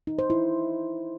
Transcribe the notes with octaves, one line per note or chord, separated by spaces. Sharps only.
D#4
C5
E4